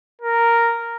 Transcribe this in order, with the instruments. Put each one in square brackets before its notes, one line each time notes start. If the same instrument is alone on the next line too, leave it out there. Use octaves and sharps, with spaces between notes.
[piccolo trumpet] A#4